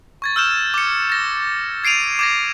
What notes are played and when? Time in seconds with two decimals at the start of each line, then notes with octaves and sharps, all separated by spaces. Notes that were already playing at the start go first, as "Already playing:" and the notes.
0.22 C#6 G#6 A6
0.36 E6 F6 G6 E7
0.74 D6 C#7
1.10 A6 A#6
1.84 G#6 C7 D7 D#7 F7
2.19 D6 G#6 A#6